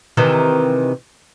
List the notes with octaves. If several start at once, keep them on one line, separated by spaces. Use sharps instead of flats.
C3 D#3 E3